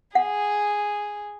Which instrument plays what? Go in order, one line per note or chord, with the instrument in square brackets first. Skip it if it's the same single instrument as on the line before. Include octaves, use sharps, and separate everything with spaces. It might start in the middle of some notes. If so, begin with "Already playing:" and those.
[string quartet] G#4 [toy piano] F#5